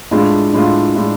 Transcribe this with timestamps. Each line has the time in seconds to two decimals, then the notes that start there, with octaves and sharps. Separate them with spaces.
0.11 A2 G#3 D4 F4
0.53 A2 G#3 D4 F4
0.95 A2 G#3 D4 F4